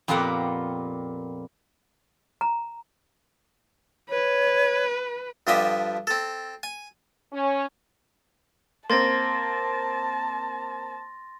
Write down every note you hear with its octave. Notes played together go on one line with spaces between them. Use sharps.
F2 A#2 B3 G4 A#4 F#5
A#5
B4 C#5
G2 D3 F3 G4 D#5 E5
C4 A4
G#5
C#4
A#3 C4 A5 C6 A6 A#6